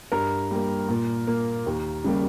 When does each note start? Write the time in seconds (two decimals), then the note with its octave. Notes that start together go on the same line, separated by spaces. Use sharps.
0.12 G2 A#4
0.51 G3 A#3
0.89 A#2
1.27 A#3
1.66 D#2
2.04 C#3 G3 A#3